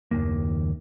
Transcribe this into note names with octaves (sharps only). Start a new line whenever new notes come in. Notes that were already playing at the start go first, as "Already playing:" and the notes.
F#1 D#2 D#3 A#3